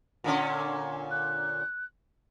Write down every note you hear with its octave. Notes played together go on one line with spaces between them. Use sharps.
A#2 D3 C#4
F#6